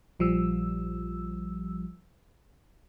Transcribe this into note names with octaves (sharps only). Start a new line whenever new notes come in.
A#1 F3 G3 E6